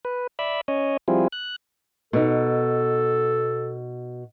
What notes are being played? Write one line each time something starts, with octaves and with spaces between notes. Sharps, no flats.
B4
D5 E5 B5
C#4 C#5 D#5
F3 G3 C4 E4 F4 G#4
F#6
B2 B3 D#4 A4